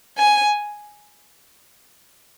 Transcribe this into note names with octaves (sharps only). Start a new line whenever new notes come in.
G#5